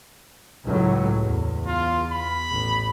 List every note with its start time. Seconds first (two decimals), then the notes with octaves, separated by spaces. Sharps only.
0.66 C#2 A2 F#3
1.20 E2
1.66 F4
2.12 B5
2.51 A1